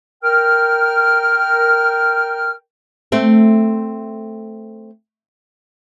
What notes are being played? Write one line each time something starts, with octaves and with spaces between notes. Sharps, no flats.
A#4 G5 F6
A3 C4